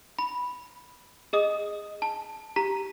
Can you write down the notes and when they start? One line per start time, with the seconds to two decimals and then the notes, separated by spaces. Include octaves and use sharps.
0.19 B5
1.33 G#4 D#5 D#6
2.02 A5
2.56 G4 A#5 B6